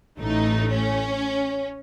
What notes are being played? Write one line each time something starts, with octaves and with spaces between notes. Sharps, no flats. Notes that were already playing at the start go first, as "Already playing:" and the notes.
A1 A2 A3 D#4
C#4